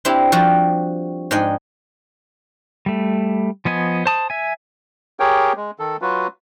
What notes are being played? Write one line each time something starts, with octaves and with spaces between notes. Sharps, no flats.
C4 D4 E4 G4
F3 G3 F#4 G4
G#2 D4 D#5 G5 G#5
G3 A3
F3 B3 D#5 G#5
C5 A5 D#6
E5 G#5
G4 G#4 A#4 C#5 G5
G#3
D#3 A4
F#3 F4 F#4 B4